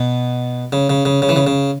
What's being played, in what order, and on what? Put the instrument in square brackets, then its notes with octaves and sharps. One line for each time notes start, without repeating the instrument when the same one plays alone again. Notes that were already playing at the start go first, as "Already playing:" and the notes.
Already playing: [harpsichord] B2
C#3
C#3
C#3
C#3
E3
C#3
C#3